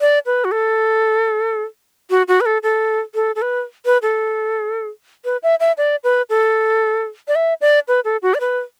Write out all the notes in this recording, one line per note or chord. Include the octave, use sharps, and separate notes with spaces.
D5
B4
F#4
A4
F#4
F#4
B4
A4
A4
A4
A4
B4
B4
A4
B4
E5
E5
D5
B4
A4
D5
E5
D5
B4
A4
F#4
D5
B4